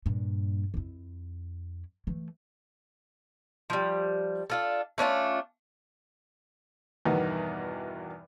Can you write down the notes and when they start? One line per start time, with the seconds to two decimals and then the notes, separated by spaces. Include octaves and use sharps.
0.06 G2 A#2
0.74 F2 E4
2.07 E3 A3
3.70 F3 G3
4.50 D4 F4 A4
4.98 A3 C#4 D4 F4
7.05 E2 G2 B2 D#3 B3 D#4